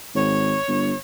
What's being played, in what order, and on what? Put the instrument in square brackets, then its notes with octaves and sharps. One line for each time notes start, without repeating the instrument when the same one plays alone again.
[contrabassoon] G#1 [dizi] C#5
[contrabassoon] G1